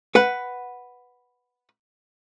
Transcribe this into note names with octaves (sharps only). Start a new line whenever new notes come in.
B4 F#5